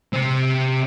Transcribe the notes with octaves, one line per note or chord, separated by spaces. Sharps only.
C3 C4